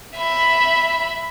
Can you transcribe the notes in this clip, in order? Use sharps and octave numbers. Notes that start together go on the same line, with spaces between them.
E5 B5